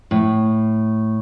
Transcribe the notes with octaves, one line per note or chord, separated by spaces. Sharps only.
A2